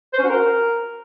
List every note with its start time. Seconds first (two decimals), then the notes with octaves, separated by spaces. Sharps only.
0.13 C5
0.19 C#4
0.24 F#4
0.29 A#4